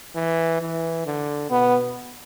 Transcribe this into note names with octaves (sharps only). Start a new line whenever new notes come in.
E3
E3
D3
B2 B3